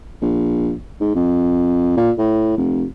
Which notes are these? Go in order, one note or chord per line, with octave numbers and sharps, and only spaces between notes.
A#1
G#2
F2
A#2
A2
F1